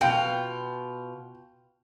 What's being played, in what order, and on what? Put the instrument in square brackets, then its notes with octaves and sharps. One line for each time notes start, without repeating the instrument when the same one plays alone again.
[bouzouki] B2 F4 [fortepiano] G5